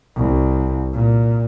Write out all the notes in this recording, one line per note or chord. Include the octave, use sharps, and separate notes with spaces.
C2
A#2